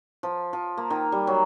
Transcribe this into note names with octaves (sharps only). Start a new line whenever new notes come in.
F3
F3
A#3
D#3
G3
F#3